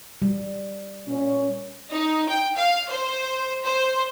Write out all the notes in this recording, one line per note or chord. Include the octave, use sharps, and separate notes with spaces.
G3
A#2 C#4
D#4
G5
F5
C5
C5